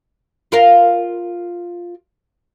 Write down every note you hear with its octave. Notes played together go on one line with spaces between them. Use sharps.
F4 A#4 F5